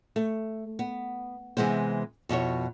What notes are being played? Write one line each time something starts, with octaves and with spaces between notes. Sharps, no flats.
A3
B3
C3 E3 G#3 B3 C5
F2 B2 E4 C#5